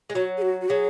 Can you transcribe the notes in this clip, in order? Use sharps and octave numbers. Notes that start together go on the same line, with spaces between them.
G#3
F#3 F#4
G#4
F#4
F#4
F#3 G#4